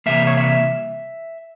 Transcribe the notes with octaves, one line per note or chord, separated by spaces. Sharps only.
C3 E3 G3 A#3 E5
C#5
E5